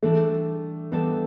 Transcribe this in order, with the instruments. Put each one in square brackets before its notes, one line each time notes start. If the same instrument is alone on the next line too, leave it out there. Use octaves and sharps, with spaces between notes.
[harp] E3 G3 D4 A4 [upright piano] A3
[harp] E3 G3 D4 A4 [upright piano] B3